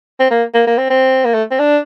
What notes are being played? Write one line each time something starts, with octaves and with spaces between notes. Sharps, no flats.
C4
A#3
A#3
A#3
C4
C4
A#3
A3
C4
D4